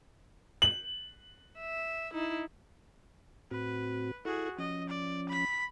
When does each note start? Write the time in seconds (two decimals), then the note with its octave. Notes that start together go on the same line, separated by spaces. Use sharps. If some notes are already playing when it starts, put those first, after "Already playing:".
0.62 F#7
1.59 E5
2.13 D#4 E4
3.51 A2 C4 F#4 B4
4.25 E4 F#4 G#4 A4
4.58 F3 C#4 D#5
4.89 D5
5.29 B5 B6